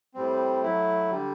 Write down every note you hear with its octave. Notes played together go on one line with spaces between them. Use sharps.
A2 G3 C4
F#3 A3 E4
D3 G3